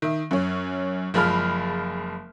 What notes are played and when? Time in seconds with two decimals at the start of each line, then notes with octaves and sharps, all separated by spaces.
0.02 D#3 E5
0.31 F#2 C#4
1.14 F#1 F3 G#3 B5 F6